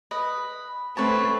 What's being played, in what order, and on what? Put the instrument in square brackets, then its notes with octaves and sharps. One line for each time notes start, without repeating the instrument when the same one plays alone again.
[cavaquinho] B4 D#5
[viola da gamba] A3 C4 [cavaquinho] B4 C#5 A5